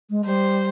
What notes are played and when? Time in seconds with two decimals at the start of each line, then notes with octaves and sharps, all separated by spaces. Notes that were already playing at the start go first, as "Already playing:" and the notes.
0.10 G#3
0.26 G3 C5